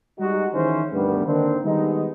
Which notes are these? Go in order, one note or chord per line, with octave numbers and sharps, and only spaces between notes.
G3 G#3 D#4 F#4
D#3 E3 C#4 E4 G#4 C5
D2 G2 D#3 G3 A3 B3
D3 D#3 A#3 C4 D4 D#4
D#3 G3 G#3 B3 D#4